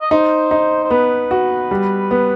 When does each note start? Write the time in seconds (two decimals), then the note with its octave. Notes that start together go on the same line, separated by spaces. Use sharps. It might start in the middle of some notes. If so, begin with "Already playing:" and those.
0.01 D#5
0.11 D#4 C5
0.51 D#4
0.84 C5
0.90 B3 B4
1.31 F#4
1.71 G3
2.11 B3